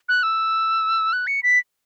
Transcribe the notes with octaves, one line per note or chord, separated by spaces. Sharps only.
F#6
E6
F#6
C#7
B6